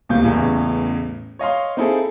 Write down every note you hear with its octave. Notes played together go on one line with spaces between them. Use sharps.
D1 D#2 C3 A#3 G6
A1 E2 A2 C#3
C#5 D#5 F5 C6
C4 D#4 E4 G#4 A4